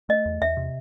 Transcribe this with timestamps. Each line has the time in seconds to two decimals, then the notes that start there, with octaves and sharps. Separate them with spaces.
0.09 A3 D#5
0.26 E2
0.41 E2 E5
0.57 C3